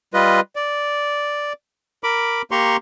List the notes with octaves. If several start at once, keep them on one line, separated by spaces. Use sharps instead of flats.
G3 F4 B4 D#5
D5
A#4 B5 D6
A#3 G4 A#5 C6 C#6